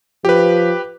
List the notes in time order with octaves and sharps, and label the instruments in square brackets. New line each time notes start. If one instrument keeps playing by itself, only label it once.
[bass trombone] F3 [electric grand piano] G4 B4